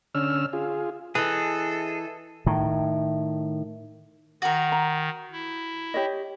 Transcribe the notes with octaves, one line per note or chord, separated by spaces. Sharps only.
D3 C#4 E6 F6
F4 G#4
E3 G#4 A4 D#5
A2 D#3
D#3 F#4 A#4
A#5
E4
G4 C#5 D#5